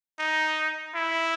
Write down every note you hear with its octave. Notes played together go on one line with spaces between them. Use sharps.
D#4
E4